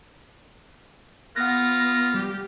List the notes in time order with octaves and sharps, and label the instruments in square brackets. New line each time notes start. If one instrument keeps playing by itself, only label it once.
[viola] B3 [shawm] F4 [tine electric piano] F#5 D#6 F#6 [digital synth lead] A#6
[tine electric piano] G3 [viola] G4